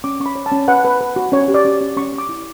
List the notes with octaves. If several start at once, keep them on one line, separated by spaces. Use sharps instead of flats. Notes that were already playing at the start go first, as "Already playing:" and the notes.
C#4 D6
C#4 C#6
B5
C#5
A5
C#4
B4 F#5
B4
B4
F#4
C#4 C#5
G4
D5
C#4
C#4
C#4 C#6
C#4
D6
E4